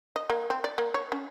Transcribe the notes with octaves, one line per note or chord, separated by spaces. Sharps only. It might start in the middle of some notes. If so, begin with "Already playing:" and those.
D#5
A#3
C4
D5
A#3
C#5
C#4